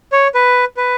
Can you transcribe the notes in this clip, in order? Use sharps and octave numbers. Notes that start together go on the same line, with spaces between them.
C#5
B4
B4